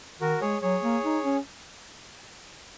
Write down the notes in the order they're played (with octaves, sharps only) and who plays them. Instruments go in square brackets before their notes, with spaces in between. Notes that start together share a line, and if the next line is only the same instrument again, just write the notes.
[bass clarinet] D#3 [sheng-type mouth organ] F#4 A#4
[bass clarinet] G#3 [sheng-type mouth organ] G#4 C#5
[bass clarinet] F#3 [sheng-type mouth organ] G#4 C#5
[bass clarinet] A#3
D#4
C#4